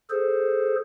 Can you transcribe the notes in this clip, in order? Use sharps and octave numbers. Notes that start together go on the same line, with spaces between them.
G#4 A4 C5